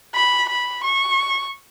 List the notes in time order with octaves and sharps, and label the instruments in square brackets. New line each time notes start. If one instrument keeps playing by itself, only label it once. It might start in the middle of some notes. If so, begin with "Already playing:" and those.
[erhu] B5
B5
C#6